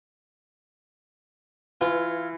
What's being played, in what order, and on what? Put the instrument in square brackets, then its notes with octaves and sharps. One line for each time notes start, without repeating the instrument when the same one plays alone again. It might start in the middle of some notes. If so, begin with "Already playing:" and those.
[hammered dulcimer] E3 [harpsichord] F4